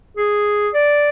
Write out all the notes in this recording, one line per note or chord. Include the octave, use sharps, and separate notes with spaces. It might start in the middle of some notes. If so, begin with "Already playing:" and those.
G#4
D5